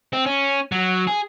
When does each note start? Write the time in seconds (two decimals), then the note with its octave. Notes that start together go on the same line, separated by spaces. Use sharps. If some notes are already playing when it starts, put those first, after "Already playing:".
0.13 C4
0.26 C#4
0.72 F#3
1.07 G#4